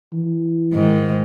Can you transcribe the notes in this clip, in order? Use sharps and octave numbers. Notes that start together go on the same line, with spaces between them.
E3
G#2 D#3